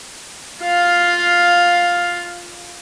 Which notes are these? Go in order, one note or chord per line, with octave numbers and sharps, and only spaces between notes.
F4 F5